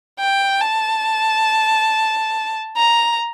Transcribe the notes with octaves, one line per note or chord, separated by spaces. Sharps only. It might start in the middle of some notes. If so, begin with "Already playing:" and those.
G5
A5
A#5